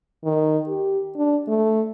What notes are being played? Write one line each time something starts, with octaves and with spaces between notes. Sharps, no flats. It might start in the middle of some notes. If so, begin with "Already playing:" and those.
D#3
G4
D4
A3